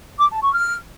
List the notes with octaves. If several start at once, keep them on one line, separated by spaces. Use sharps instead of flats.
D6
A5
C#6
F6